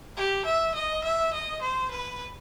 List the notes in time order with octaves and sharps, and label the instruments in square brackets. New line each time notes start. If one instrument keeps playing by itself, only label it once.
[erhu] G4
E5
D#5
E5
D#5
C5
B4